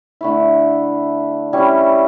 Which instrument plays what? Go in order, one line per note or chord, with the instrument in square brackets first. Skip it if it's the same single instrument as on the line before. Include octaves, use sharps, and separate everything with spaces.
[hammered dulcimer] D3 A3 E4
G3 C#4 E4